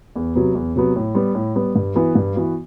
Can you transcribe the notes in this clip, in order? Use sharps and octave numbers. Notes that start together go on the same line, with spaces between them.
E2
C3 F#3 B3
E2
C3 F#3 B3
A2
G3 B3
A2
G3 B3
G2
E3 B3 F#4
G2
E3 B3 F#4